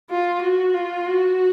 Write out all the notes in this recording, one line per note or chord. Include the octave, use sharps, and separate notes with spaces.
F4
F#4
F4
F#4